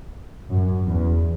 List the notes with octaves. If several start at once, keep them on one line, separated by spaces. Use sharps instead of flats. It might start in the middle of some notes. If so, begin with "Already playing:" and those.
F#2
E2